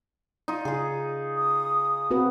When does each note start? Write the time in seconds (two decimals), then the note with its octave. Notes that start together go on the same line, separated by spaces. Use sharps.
0.48 D#4 F4
0.65 C#3 F4 G#4
1.36 D#6
2.11 C4 F#4 B4